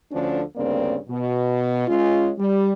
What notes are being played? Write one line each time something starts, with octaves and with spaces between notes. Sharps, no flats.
D2 D3 F3 C#4 D4
D2 G2 C#3 A#3 C4 D5
B2
G#3 C#4 F4
G3